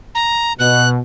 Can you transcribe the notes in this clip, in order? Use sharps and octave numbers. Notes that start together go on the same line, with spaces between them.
A#5
B2 F#6